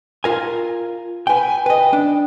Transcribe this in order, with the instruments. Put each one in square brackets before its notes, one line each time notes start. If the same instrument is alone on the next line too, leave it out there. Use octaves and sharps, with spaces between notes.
[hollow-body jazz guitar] F4 A#4 G#5
[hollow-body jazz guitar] B4 G5 [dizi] G#5
[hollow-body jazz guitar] B4 D#5 [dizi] G5
[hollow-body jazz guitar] D4